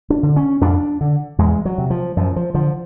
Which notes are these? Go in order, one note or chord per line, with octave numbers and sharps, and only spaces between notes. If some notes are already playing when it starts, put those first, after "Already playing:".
D4
D3
C#4
F2 D4
D3
E2 G#3
F#3
C3
F3
F#2 F3
F3
D3 F3